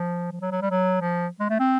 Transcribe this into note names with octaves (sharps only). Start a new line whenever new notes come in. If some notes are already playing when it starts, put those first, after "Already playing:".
Already playing: F3
F3
F#3
F#3
G3
F#3
F3
G#3
A3
C4